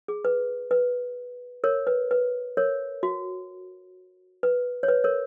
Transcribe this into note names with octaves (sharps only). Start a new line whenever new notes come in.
G#4
B4
B4
A#4 C#5
B4
B4
A#4 C#5
F#4
B4
C#5
B4
A#4 C#5